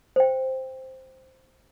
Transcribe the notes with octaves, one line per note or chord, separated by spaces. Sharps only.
C5 G5